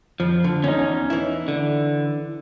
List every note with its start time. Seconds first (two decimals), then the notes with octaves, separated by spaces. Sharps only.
0.20 F2 F3
0.44 D3
0.64 E2 C#4 D#4
1.10 E3 E4
1.48 D3